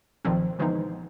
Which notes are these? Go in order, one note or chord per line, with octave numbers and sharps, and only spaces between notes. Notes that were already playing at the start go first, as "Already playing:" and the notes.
B1 A#2 D#3 F3 C4
D3 E3 F3 G#3 B3 D#4